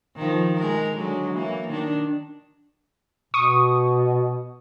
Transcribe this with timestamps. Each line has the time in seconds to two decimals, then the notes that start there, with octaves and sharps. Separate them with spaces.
0.17 D#3 F3
0.57 G#3 A#4
0.95 D3 F#3 G#3
1.33 E3 A#3
1.68 D#3 D4
3.34 B2 C#6 D#6